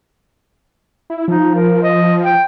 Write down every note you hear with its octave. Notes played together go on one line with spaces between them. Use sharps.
E4
F3 D#4
A#4
D#5
G5